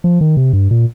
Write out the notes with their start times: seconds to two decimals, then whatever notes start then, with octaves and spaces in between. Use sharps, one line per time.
0.04 F3
0.21 D#3
0.37 C3
0.53 G2
0.71 A#2